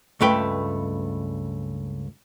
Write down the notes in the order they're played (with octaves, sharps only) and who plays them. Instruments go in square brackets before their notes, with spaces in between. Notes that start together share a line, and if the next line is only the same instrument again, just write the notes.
[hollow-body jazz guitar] C#2 G2 A3 B4 G5